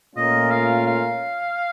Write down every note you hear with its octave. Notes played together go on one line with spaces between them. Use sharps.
A#2 A3 C#4 F4 A#4 D#5
F5
F5